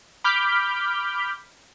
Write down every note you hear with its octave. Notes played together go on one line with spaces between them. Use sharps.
B5 D6 F6 G6 B6